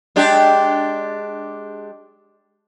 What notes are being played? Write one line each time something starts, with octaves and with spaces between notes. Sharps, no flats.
G#3 D4 G4